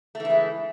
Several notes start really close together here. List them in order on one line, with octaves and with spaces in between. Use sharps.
A3 E3 E4 G#3